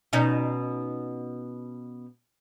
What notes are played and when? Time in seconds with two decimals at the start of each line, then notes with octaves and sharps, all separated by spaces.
0.13 B2 C#4 D#4